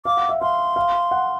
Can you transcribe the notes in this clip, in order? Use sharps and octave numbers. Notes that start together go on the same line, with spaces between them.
F5 D6
F#5
E5
F5 C6
F5
F#5